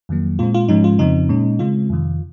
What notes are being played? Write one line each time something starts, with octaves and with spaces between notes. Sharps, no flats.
F2 D#3 F#3 A#3
A#2 G#3 C4 F4
F4
G#2 F3 G#3 C#4 D#4
F4
F2 C#3 F3 C4 D#4
A#2 G#3 C#4
C#3 G#3 C4 F4
F2 C3 D#3